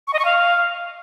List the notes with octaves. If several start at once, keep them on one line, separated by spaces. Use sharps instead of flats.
C#6
D#5
C#6
F5